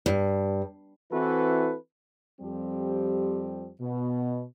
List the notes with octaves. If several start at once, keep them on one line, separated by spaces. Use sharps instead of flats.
G2
E3 C4 E4 F#4 A4 B4
F2 F3 G3 C4 G4
B2